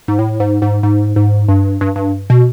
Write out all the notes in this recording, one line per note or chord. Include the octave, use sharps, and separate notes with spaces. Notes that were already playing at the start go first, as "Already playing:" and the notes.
G#2
A2
G#2
G#2
G#2
G#2
G2
G2
G2
B2